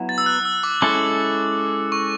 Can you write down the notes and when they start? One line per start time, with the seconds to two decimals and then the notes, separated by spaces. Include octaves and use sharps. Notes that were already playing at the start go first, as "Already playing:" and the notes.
Already playing: F#3 B3 E4
0.09 A6
0.18 E6
0.26 F#6
0.45 E6
0.63 D6
0.82 G#3 C#4 E4 A4 D6
1.92 C#6